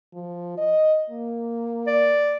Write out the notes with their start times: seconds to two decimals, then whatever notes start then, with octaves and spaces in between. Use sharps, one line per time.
0.13 F3
0.57 D#5
1.10 A#3
1.87 D5